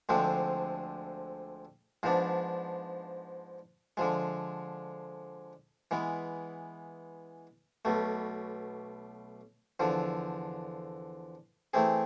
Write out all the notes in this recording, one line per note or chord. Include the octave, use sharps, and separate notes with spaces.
D2 D3 F3 G#3 C4
G#2 F3 B3 D4
D3 F3 G#3
E3 G#3 B3
B1 B2 A3
E2 D3 F3
E3 A3 C4 G#4